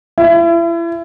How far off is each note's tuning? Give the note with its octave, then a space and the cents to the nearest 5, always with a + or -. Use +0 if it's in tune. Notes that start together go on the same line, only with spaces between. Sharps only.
E4 +35